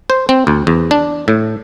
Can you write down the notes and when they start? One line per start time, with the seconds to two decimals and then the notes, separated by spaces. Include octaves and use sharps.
0.10 C5
0.29 C4
0.47 D2
0.67 E2
0.91 D4
1.28 A2